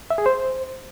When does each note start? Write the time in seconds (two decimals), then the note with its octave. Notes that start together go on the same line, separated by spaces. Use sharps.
0.10 E5
0.18 G#4
0.26 C5